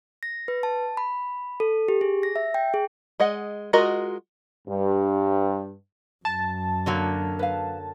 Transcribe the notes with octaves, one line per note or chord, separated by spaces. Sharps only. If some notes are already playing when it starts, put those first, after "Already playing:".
A#6
B4
A5
B5
A4
G4
G#4
A#6
E5
G5
G#4
G#3 D#5 F#5
G#3 F4 F#4 A#4 D#5
G2
F#2 A5
D3 F#3 A#3
B4 F5